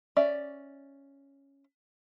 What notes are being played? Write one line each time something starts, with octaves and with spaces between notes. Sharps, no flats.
C#4 D5 E5